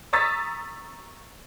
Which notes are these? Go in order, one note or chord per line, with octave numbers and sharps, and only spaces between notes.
A#5 C#6 D#6 E6 A6 B6